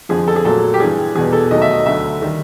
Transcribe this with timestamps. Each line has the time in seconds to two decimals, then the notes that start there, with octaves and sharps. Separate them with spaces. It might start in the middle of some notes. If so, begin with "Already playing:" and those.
0.09 F2 D3 F3 G#4
0.28 A4
0.36 G#4
0.45 A#2 F#3 A3 A4
0.74 G4
0.80 G2 E3 G3 G#4
1.15 E2 B2 G3 G#4
1.33 A4
1.51 D#2 D#3 F#3 A3 D#5
1.62 E5
1.73 D#5
1.86 D2 D3 F#3 A3 E5
2.22 D#3 G3